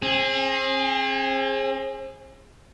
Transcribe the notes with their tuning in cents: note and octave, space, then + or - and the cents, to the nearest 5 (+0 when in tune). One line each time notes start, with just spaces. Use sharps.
C4 +40 G#4 +0